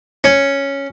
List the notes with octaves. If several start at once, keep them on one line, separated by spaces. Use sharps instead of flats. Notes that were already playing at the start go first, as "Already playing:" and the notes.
C#4